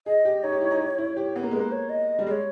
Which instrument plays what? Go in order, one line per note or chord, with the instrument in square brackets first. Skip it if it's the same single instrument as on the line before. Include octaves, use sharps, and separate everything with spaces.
[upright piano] G#4 [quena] D#5
[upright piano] G4
[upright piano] D#4 [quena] C#5
[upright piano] G4
E4
D#4
G4
E4
G4
B3
A#3
[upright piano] G#3 [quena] B4
[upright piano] A#3
[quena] C#5
D#5
[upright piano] G3
[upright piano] G#3 [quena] D#5
[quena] C#5